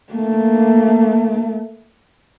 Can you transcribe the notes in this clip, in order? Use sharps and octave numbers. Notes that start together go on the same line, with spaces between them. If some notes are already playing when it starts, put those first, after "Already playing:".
A3 A#3